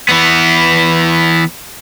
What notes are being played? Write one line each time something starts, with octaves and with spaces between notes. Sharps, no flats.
E3 B3